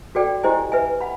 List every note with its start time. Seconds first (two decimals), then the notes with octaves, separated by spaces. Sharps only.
0.15 F#4 A4 D5 G5
0.43 E4 G4 C5 D#5 G#5
0.72 B4 E5 G#5
1.01 F#5 B5